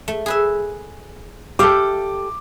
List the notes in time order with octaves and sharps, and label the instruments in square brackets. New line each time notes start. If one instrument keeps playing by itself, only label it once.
[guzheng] A3
G#4 B4 E5
[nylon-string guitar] G4 A4 [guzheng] E5 F5 G5 [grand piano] D6